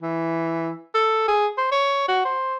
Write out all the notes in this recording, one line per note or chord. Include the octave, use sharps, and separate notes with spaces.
E3
A4
G#4
C5
C#5
F#4
C5